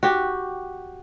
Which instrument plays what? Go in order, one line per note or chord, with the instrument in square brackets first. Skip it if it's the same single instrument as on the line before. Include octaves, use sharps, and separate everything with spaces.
[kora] F#4 G4